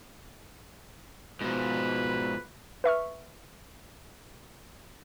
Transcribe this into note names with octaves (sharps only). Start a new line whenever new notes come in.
G#2 B2 F3 B4
B4 E5 C#6 F6